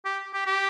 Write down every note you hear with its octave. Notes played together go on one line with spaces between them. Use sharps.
G4
G4
G4